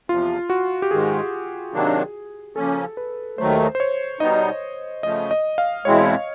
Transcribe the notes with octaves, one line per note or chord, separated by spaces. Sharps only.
E2 C3 F3 F4
F#4
G4
G#2 D#3 G#3 G#4
C3 D#3 F#3 A#3 D4
C#3 F3 A#3 C#4 A4
B4
D#2 D#3 F#3 A3 C5
C5
C#5
B2 G3 B3 D#4 D#5
C#3 F3 A3 D#5
D#5
F5
E2 B2 G#3 C4 E4 C#5